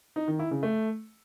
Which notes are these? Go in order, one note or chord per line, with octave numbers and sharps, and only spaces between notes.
D#4
D#3
E4
C#3
A3